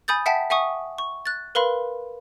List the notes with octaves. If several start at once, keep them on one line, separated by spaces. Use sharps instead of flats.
G#5 B5 D#6 G6 A6
E5 F#5 G5 A5 B6
E5 F#5 G#5 C#6 D#6
C#6
F#6 A6
A#4 B4 F5 B5 C6